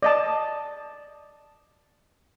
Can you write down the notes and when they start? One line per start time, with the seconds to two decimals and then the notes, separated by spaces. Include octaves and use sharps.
0.03 D5 D#5 A5